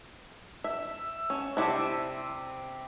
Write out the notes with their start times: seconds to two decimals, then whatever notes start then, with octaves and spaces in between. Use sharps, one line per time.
0.64 E5 E6
1.30 C#4
1.57 C3 D4 E4 G4